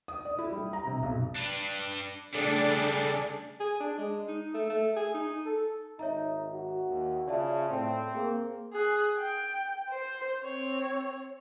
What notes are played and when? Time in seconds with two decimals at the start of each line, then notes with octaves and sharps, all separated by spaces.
0.08 D#6
0.25 D5
0.39 E4
0.52 G3
0.73 A#5
0.87 C3
1.03 B1
1.36 D4 B4
2.35 C#3 G3 A3 D4 G#4 A4 D5
3.60 G#4
3.80 D4
3.98 G#3
4.28 D#4
4.54 A3
4.69 A3
4.96 G#4
5.14 D#4
5.46 A4
5.99 G#1 D#4 C#5 E5 A#5
6.52 F#4
6.88 D#2
7.28 C#3 F4 D5 E5 A5
7.70 A2 C4
8.15 A#3 G#4
8.73 G#4 F#6
9.19 G5
9.90 C5
10.43 C4 C#5